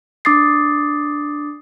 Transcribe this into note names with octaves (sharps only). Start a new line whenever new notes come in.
D4 D6 D#6 A6 C7